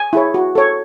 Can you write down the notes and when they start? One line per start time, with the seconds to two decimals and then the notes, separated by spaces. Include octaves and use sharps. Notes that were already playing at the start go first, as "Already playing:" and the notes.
Already playing: G#5
0.13 E4 G#4 C#5
0.34 F#4
0.55 A4 C#5